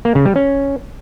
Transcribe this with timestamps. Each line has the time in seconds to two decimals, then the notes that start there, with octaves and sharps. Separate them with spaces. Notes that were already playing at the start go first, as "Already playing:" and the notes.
0.05 A#3
0.15 C#3
0.25 G3
0.36 C#4